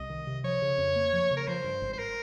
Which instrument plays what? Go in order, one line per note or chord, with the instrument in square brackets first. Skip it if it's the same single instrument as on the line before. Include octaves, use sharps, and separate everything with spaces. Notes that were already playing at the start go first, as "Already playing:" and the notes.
Already playing: [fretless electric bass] C2 [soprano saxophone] D#5
[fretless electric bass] D#3
C3
[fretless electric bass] F3 [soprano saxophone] C#5
[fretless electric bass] C#3
F2
A#3
F3
C#3
[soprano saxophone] A#4
[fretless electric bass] F3 [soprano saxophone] C5
[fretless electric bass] G2
G#1
[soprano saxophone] C5
A#4